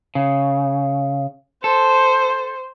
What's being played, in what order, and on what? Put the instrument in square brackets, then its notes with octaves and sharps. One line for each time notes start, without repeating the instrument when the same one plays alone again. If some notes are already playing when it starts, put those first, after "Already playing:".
[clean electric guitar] C#3
[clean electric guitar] A4 [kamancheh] C5